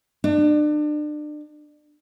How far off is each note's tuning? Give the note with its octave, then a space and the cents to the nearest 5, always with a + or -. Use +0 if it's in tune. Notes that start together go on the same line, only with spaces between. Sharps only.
D4 +35